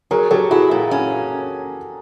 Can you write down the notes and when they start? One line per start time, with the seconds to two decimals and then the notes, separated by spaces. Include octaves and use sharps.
0.11 F#3 G#4 A#4
0.31 F#3 G4 A4
0.51 E4 F#4 G#4
0.71 A#2
0.91 C#4